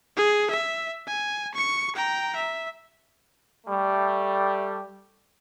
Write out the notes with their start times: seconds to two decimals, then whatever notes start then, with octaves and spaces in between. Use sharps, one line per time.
0.17 G#4
0.50 E5
1.07 G#5
1.54 C#6 C#7
1.96 G5 A#5
2.36 E5
3.67 G3 A3